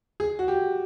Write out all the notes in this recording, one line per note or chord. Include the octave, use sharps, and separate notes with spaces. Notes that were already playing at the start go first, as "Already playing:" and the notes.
G#4
F#4
G4